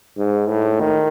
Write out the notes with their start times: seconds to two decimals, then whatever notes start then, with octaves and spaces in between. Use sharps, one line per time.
0.17 G#2
0.48 A2
0.80 D#3